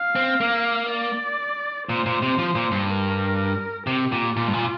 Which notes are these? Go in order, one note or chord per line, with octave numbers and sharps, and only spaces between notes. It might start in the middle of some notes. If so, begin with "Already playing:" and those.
Already playing: F5
C4
A#3
D5
A#2 C5
A#2
C3
F3
A#2
G2
A#4
C3 G4
A#2
A#2 F4
G2
A#2